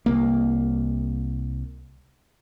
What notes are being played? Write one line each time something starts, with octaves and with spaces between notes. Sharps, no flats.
C2 A#3